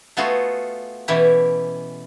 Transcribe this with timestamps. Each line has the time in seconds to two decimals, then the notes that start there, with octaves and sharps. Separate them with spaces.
0.17 A3 B3 F4 F#4 G#4 A4
1.08 B2 E3 C#4 E4 G4